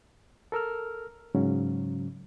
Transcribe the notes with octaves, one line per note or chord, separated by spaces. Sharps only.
A4 A#4 E6 F6
G#2 C#3 F#3 C#4